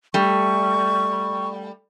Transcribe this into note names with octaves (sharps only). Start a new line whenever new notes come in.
G3 A3 C#6